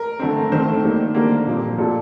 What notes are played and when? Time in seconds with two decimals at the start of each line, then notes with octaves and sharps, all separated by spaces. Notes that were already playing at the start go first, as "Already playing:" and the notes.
Already playing: A#4
0.19 D3 A3 C4
0.52 D#3 A3 C4 C5
0.84 D#3 G3 A#3
1.14 D3 G3 A#3 A#4
1.47 A#2 F3 C4
1.78 A#2 G3 C4 A4